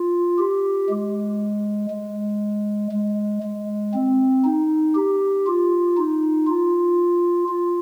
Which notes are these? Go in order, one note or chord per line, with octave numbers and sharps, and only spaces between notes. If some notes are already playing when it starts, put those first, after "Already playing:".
Already playing: F4
G4
G#3
G#3
G#3
G#3
C4
D#4
G4
F4
D#4
F4
F4